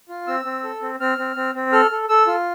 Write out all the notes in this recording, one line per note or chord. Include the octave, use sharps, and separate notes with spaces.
F4
C4 E6
C4
A4
C4
C4 F6
C4
C4
C4
A4 F6
A4
A4 E6
F4